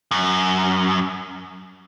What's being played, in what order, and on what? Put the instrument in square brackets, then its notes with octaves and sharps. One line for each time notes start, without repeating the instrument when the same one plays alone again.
[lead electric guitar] F#2